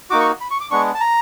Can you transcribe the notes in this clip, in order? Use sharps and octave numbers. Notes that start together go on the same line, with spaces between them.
A#3 D#4 F#4 D6
C#6
B5
C#6
D6
G#3 B3 D4 C#6
A5
A#5